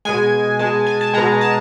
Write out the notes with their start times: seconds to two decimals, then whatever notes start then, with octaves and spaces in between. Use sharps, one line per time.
0.05 B2 G#3 G#5
0.59 B2 G#3 A5
0.87 G#5
1.01 A5
1.14 B2 G#3 A#5
1.41 A5